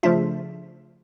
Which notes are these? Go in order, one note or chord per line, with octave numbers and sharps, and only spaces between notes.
C#3 F3 A3 D4 F4 E5